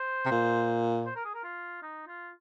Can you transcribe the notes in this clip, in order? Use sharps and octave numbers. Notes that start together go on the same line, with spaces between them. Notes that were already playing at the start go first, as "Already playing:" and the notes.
Already playing: C5
C3
A#2
C5
A#4
G#4
A#4
F4
D#4
F4